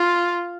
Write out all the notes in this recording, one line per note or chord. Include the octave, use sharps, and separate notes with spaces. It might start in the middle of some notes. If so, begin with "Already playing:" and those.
Already playing: F4